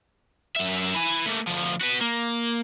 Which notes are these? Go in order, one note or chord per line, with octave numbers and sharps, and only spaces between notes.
F#2 E5
E4 G#5
A3 A#3
D2 F3
F#4 B4
A#3